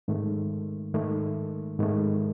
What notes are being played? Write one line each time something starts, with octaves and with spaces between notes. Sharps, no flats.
G#2 D#3 A3
G#2 D#3 A3
G#2 D#3 A3